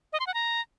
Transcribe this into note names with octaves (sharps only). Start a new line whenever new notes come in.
D#5
C6
F#5
A#5